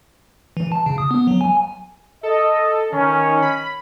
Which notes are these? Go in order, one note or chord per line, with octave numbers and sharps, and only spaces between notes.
E3
A5
C#3
D#6
B3
F#3
G#5
A4 D#5
D#3 C#4
B5